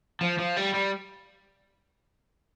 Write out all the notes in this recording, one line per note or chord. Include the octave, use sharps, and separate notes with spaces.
F3
F3
G3
G3